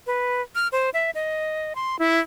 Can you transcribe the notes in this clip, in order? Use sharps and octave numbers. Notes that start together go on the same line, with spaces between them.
B4
F6
C5
E5
D#5
C6
E4